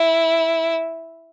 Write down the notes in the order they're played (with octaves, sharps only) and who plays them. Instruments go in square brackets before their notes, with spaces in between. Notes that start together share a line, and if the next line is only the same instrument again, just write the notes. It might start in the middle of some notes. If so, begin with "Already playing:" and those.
Already playing: [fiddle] E4